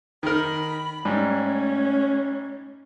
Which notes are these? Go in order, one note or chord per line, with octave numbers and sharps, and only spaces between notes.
D#3 A#4 B5
G#2 G3 A3 C#4